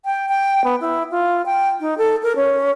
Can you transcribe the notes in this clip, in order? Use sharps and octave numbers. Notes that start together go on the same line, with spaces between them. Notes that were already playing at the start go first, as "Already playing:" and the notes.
G5
G5
B3
E4
F4
G5
D#4
A4
A#4
C#4